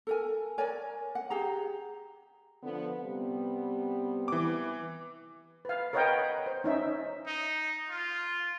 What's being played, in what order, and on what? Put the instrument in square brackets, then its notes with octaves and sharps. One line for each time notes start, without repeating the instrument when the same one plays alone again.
[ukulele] A4 A#4 G#5
A#4 C#5 D5 G#5
F#5
G4 G#4 A#5
[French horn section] D3 F3 B3
C3 G3 B3
[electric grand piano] E3 D6
[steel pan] B4 F5
A#4 B4 C#5 D#5 F#5 G5
C5
C#4 D#4 E5
[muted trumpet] D#4
F4